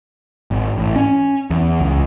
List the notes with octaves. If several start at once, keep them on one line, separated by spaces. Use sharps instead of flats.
G#1
A1
C#4
E2
C#2